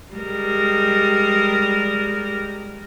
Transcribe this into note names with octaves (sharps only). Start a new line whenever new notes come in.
G3 G#3 A#4